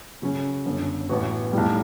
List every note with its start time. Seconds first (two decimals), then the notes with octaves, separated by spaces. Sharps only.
0.22 C#3 F#3 C#4
0.66 G1 F#2 D3
1.09 A1 A2 E3 B3 F#4
1.53 B1 A2 G3